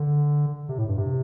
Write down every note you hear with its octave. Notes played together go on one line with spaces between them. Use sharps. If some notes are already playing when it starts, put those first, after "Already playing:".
Already playing: D3
C3
A2
G2
C3